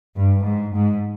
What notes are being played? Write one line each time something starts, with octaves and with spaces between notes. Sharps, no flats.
G2
G#2
G#2